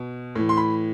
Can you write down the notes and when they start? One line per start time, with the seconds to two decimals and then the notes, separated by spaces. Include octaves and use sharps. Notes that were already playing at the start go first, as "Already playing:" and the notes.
Already playing: B2
0.36 A2 E3
0.49 C6
0.57 B5